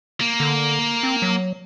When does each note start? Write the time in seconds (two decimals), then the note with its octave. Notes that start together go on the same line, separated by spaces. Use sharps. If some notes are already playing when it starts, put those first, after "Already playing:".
0.21 A#3
0.40 D3
1.03 C4
1.22 F#3